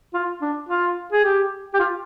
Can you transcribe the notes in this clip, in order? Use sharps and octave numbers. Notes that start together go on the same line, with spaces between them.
F4
D4
F4
G#4
G4
G4
F4